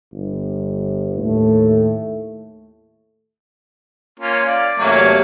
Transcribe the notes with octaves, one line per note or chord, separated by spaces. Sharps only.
G1
D#2 A2 A3
A#3 C#4 F4
D5 F5
E2 C3 F#3 A3 A#3 C#4